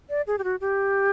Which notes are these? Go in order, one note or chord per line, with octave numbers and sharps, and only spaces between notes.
D5
G#4
G4
F#4
G4